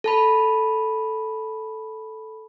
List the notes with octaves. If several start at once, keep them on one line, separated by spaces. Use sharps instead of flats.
A4 A5 B5